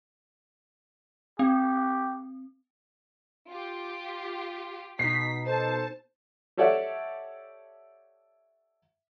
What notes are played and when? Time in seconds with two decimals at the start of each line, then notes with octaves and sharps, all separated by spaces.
1.39 C4 G4
3.50 F4 G4
4.99 B2 D#4 B6 C7
5.46 A4 C5 A5
6.57 G4 A4 C#5 D5 E5 F#5